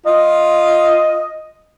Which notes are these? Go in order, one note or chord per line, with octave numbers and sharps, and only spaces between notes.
F4 D#5